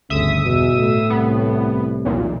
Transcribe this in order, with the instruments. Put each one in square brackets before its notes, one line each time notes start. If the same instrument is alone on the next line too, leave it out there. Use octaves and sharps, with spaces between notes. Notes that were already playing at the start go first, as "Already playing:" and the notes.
[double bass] G1 D2 [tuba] C#3 [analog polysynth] E5 D#6
[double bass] E2 [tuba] B2
[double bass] A2
[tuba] C2 [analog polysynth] B3
[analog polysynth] B1 E2 A#2